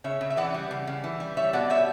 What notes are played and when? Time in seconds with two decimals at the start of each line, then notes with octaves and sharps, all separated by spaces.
0.04 C#3 C#5 E5
0.21 C#3
0.30 E5
0.37 E3 D5 F#5
0.54 G3
0.71 C#3
0.87 C#3
1.04 E3
1.20 G3
1.37 G3 C#5 E5
1.53 B2 D5 F#5
1.70 G3 C#5 E5